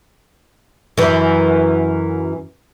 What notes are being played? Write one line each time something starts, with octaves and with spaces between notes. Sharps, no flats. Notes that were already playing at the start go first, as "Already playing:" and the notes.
F#2 E3